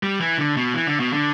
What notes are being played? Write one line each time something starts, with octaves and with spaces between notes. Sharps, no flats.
G3
E3
D3
B2
E3
D3
B2
D3